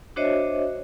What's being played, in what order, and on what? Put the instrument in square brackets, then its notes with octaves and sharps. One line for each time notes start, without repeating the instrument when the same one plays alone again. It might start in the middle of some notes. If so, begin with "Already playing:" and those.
[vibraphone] D4 F#4 C5 C#5 D#5 E5